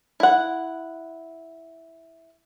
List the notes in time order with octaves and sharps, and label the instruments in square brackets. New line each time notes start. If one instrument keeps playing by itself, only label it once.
[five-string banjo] E4 F#5